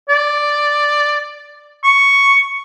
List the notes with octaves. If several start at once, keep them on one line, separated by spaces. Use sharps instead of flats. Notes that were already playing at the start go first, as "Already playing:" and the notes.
D5
C#6